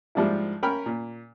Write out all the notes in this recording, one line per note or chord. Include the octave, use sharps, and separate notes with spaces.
G#2 F3 G3 D4 E4
C#4 A#4 G5 B5 F6
A#2